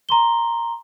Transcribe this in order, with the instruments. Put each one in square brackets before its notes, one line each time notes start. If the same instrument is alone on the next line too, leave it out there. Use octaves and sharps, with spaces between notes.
[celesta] A#5 C6 G7